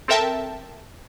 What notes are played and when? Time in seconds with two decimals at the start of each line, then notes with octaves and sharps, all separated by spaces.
0.08 C4 A4 A#4 E5 G5 A5